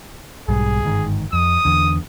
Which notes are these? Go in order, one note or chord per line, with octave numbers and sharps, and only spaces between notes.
B1 G#2 G3 G#4
G1 G#2 D#3
F2 D#6
E2 D3